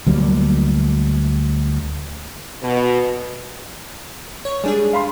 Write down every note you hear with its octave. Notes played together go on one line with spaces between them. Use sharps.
D2 F#3 G3 A#3
B2
C#5
G3 G#3 D4 G#4
F5 B5 C6